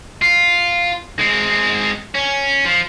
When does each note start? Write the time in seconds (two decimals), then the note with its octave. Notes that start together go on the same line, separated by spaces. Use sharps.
0.22 F4
1.19 G#3 C4
2.14 C#4
2.65 F3